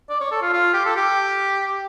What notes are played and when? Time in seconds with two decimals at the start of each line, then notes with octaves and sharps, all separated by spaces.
0.10 D5
0.21 C#5
0.31 A4
0.42 F4
0.53 F4
0.74 G4
0.85 A4
0.96 G4